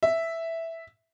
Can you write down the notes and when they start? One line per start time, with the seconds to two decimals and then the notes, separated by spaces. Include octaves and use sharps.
0.03 E5